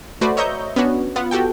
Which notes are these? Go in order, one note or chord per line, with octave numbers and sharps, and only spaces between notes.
A3 F#4 B4 C5 D5
C#5 D#5 E5 A#5 C#6 G6
B3 C#4 D4 F#4 C#5
B3 F4 F#5
F#4 G4 A4 G5